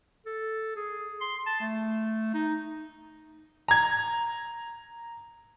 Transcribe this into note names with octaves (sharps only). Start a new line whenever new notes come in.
A4
G#4
C6
A5
A3
D#4
A#5 G#6